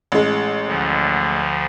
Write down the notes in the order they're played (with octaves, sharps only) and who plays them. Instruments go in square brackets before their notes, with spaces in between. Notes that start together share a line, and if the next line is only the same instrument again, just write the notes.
[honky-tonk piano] A1 G#3
[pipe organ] D2 D3 F3